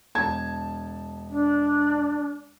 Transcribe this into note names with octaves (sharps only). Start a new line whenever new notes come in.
E1 A5 G#6
D4